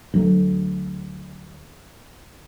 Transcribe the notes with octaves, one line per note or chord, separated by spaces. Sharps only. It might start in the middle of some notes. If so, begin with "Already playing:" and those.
D2 F#3 A3